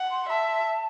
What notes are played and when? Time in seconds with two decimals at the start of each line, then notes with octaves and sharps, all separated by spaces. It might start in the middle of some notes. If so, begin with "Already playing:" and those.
Already playing: F#5
0.10 C6
0.29 E5 A5